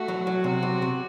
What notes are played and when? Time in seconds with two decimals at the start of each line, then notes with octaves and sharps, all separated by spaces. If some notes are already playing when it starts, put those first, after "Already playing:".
Already playing: A3 F#4
0.08 F#3
0.27 F#3
0.44 C3 F#4
0.63 C3
0.82 C3